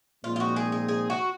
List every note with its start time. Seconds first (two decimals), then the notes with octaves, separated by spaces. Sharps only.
0.24 A#2 F3 G#3 C4 D#4 F4
0.36 F4
0.40 F#4
0.56 G#4
0.72 G#4
0.88 G#4
1.10 F#4